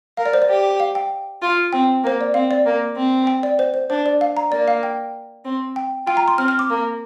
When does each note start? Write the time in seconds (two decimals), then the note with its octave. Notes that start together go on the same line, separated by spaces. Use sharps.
0.17 A#4 F5
0.26 D5
0.34 C5
0.42 D5
0.49 G4
0.80 F5
0.95 G5
1.42 F4
1.73 C4 G5
2.03 A#3 C5
2.21 D5
2.34 C4 F5
2.51 D5
2.65 A#3
2.96 C4
3.27 G5
3.43 D5
3.59 C5
3.74 C5
3.90 D4 C5
4.06 D5
4.21 F5
4.37 A#5
4.51 A#3 D5
4.68 F5
4.83 G5
5.45 C4
5.76 G5
6.06 F4 G5
6.17 A#5
6.28 C6
6.38 C4 F6
6.48 F6
6.59 D6
6.70 A#3